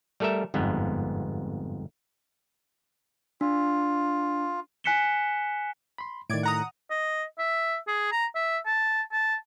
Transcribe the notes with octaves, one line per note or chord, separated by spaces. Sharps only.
G3 A3 A4 A#4 E5
G1 F2 G#2 B3
D4 F4
G#5 F#6 B6 C#7 E7 G7
B5 C6
A2 D#3 D5 G#6 D7
F#5 A#5 D#6
D#5
E5
G#4
A#5
E5
A5
A5